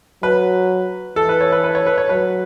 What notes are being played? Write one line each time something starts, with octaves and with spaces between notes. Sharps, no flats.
F#3 B4
E3 A4
B4
C#5
B4
B4
C#5
B4
C#5
F#3 B4